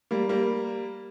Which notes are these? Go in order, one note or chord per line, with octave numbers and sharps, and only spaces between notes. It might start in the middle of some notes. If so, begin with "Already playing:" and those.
G3 A#3
G3 A#3